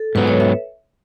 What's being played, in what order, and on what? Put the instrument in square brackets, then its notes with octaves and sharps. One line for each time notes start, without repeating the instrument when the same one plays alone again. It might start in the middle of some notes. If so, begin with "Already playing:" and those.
Already playing: [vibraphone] A4
[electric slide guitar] G#2 F#3 B3 [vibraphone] B4
[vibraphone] C#5
E5